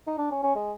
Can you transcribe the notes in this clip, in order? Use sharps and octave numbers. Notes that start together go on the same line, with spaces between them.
D#4
D4
C#4
C#4
G#3